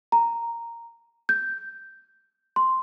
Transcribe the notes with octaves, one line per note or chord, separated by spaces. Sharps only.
A#5
G6
C6